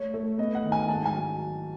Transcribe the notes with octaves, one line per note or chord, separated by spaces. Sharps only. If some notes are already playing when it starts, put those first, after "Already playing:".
Already playing: A3 C#5
A3
B3 D#5
F#5
D#3
G#5
G#2 A5
G#5
F#3